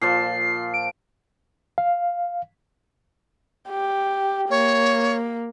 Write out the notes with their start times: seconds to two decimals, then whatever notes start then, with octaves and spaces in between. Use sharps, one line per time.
0.01 A#2 F3 A5 C7
0.74 D7
1.78 F5
3.69 G4
4.50 A#3 C#5